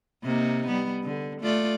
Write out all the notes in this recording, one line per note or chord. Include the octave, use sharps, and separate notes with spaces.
C3 A#3 D#4
G3 B3
D3
A3 F4 D5